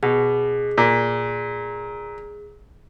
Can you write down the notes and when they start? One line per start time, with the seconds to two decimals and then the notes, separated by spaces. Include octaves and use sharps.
0.03 B2 G#4
0.78 A#2